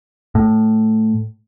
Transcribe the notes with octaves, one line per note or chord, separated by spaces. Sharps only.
A2